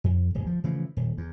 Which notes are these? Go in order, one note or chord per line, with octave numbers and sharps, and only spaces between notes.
F2
D1 G1
F3
C#3 E3 F3 A3
D#1
E2